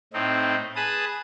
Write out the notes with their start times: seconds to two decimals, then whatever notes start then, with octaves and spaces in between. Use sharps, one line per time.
0.13 A2 C4 D#4
0.76 G#4 B4 A5 D#6